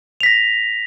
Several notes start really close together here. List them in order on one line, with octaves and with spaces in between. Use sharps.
F7 B6 A#6